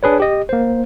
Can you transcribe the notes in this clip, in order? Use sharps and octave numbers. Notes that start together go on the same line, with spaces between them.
D4 G#4 B4 C#5
G4 D#5
A#3 C5